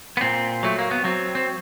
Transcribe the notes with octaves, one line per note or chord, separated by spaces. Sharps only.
B3
A#2 C4
F#3 A3
A#3
B3
F#3 C4
C4